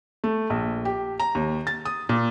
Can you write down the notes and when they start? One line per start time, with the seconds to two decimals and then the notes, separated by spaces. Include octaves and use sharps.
0.24 A3
0.50 A#1
0.85 G4
1.20 A#5
1.35 D#2
1.67 A6
1.85 D#6
2.09 A#2